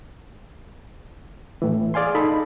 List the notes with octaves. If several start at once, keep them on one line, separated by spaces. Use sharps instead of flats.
A2 E3
G#4 D5 F5 G#5 C6
D#4 A4 D#5 B5